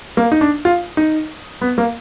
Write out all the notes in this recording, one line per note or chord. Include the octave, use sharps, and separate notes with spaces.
A#3
D#4
D4
F4
D#4
B3
A#3